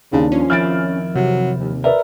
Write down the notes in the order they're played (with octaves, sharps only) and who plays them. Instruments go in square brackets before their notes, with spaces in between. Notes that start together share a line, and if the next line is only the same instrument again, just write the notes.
[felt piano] D#2 D4 [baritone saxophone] C#3
[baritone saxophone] F3 [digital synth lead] C#4
[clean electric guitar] F2 D#3 E4 [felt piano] F6 A6 D7
[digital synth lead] C3 [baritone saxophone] F#3
[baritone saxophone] D#2
[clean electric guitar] A#4 [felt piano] B4 D5 E5